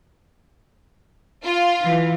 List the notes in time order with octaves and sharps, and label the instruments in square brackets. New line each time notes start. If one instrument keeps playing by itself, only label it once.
[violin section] F4
[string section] E3